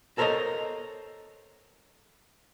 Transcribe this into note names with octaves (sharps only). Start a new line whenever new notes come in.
A4 A#4 C5 C#5 D#5